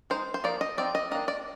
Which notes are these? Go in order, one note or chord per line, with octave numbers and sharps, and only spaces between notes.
G#3 D#4 C5
C5
F3 A#3 D#4 D5
D#5
F3 C4 D#4 D5
D#5
D#3 A#3 D4 D#5
D5